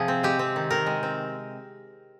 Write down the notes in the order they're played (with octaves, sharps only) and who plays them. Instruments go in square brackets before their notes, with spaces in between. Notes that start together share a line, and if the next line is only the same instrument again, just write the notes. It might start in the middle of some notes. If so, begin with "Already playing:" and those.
Already playing: [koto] C3 F3 G#4
C4
G#3 G4
C4
D#3
D#3 A#4
G#3
C4